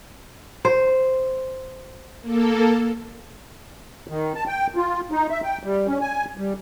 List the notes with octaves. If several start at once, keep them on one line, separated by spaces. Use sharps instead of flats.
C5
A#3 A4
D#3
A5
G5
F4
D#4
E5
G5
G3
C#4
G#5
G3